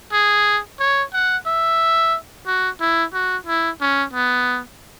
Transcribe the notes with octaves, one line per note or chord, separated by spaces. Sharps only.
G#4
C#5
F#5
E5
F#4
E4
F#4
E4
C#4
B3